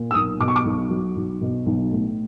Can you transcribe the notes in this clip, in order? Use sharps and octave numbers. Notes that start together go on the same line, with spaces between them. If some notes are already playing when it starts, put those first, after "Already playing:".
Already playing: A#2
E6
B1 D#6
B2 D6
C#6
D6
B1
F#3
B1
B2
B1
A2